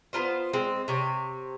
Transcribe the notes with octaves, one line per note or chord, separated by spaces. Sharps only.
B3 E4 F4 C5
G#3 C4
C3 C#5